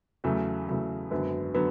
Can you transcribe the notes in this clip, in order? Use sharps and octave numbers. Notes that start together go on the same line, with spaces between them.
E2 C#3 F#3 A3
E2 C#3 F#3 A3
G#1 F#2 D3 F#3 B3
D3 F#3 B3